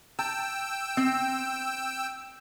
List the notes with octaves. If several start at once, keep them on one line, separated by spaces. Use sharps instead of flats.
G5 A5 E6
C4